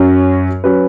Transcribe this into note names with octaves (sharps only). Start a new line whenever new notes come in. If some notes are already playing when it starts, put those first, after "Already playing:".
Already playing: F#2 F#3 C#4
F#3 C#4 B4